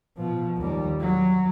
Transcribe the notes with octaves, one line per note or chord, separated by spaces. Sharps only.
B2 F3
D#2 G3
F#3